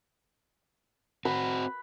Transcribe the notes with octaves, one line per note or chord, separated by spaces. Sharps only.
C4 F#4 B4